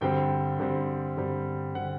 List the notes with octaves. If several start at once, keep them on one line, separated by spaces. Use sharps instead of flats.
G2 D3 G3 C4 G5
G2 D3 G3 C4
G2 D3 G3 C4
D3 G3 C4 F#5